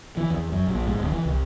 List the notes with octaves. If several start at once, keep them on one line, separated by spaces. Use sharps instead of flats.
E3
E2
F#2
A#1
G#2
D1
E3
C2